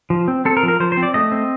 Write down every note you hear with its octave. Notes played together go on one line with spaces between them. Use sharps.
F3
C4
C4 A4
A#4
F3
A#4
F3 C5
C5
C4
D5
A3 D#5
C4